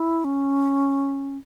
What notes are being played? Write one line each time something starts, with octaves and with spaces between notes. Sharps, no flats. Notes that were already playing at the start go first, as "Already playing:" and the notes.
Already playing: E4
C#4